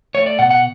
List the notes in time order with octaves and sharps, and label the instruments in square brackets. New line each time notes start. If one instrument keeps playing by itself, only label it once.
[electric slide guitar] A3 C#5
D5
B2 F#5
F#5